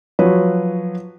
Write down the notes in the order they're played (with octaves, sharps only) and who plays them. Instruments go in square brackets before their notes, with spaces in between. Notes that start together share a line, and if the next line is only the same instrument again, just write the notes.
[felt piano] F3 F#3 B4 C#5